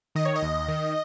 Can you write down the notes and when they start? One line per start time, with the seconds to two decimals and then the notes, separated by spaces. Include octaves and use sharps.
0.15 D#3 D#5
0.25 C#5
0.36 D#5
0.42 D#2
0.68 D#3